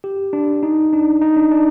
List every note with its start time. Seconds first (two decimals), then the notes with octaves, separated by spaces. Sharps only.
0.04 G4
0.33 D4
0.63 D#4
0.93 D4
1.22 D#4
1.37 D4
1.51 D4